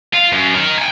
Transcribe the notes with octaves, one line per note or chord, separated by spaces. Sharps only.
F4
F#2
D#4 A#4
G5 G#5